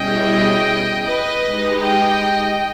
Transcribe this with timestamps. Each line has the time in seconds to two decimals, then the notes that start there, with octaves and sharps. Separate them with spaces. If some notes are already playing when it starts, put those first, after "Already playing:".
Already playing: B2 G3 C#4 E4 G#4 D#5 G5
1.06 B4 D#5
1.45 G#3 D#4 G4
1.84 D#5 G5